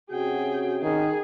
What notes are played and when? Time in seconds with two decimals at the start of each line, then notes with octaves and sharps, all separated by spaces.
0.11 C3 C#4 F#4 G#4 G5
0.83 D#3 G#4